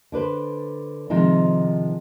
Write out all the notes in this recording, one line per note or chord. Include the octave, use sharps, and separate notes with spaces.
D3 D4 B4 C5
C3 D#3 F3 G#3 D#4